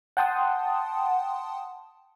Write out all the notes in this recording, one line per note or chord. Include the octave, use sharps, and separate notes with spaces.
F#5 G5 A5 C6 D#6